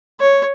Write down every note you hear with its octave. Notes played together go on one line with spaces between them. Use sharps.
C#5